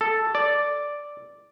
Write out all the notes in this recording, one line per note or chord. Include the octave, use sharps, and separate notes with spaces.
A4
D5